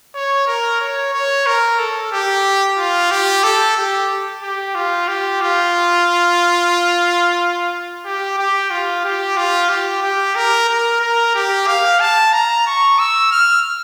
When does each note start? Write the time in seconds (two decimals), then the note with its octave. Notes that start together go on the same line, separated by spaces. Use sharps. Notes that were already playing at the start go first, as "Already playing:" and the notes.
0.15 C#5
0.47 A#4
0.81 C#5
1.13 C#5
1.46 A#4
1.79 A4
2.12 G4
2.79 F4
3.11 G4
3.43 A4
3.77 G4
4.42 G4
4.75 F4
5.08 G4
5.41 F4
8.05 G4
8.38 G4
8.71 F4
9.04 G4
9.37 F4
9.69 G4
10.03 G4
10.36 A#4
10.69 A#4
11.01 A#4
11.34 G4
11.67 F5
12.00 A5
12.33 A#5
12.67 C#6
12.99 E6
13.32 F6